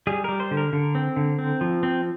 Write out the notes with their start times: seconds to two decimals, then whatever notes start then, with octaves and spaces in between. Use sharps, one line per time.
0.07 G3 G#4
0.24 G3 A#4
0.40 C5
0.51 D3
0.57 A#4
0.73 D3
0.95 C4
1.16 D3
1.39 C4
1.61 F3
1.83 C4